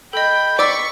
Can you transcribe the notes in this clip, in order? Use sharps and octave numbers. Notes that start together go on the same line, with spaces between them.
A4 D#5 G5 B5
D5 B5 C#6 D6 E6 A6